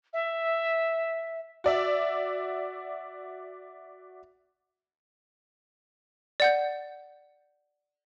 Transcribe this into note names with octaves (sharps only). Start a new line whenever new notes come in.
E5
F#4 D5 E5
D5 F#5 G6